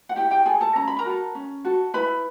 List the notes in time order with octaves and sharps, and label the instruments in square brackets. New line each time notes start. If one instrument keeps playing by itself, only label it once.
[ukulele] F#5
E4 G4 G5
G4 G5
G#4 A4 G#5
A4 A5
C#4 A#5
B5
A#4 A#5
F#4 A4
C#4
F#4 A4
E4 B4 B5